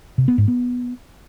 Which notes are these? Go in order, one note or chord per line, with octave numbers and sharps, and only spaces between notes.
C3
B3
G#2
B3